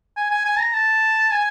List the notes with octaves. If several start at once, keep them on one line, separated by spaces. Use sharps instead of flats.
G#5
G#5
G#5
A#5
A5
G#5